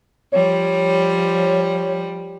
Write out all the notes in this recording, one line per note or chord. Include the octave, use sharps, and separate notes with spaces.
F3 G3 C#5